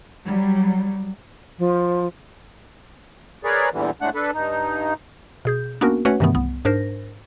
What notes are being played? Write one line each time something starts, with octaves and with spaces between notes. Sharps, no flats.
F#3 G3
F3
G#4 A#4 B4 C#5 D5
E2 A#2 D3 E3 G3
A2 G#3 A3 D4 F#5 F#6
D4 A4 B4
G2 D#4
B2 G#4 G6
A#3 B3 C#4 D4 F#4 A#4
A3 C#4 F#4 B4 C#5 F#5
G2 C3 D#3 E3 A3 B3
C2 B3
G#2 D4 A#4 C5 A#6